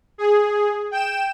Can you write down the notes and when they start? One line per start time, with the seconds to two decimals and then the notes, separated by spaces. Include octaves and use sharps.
0.18 G#4
0.91 G5 E7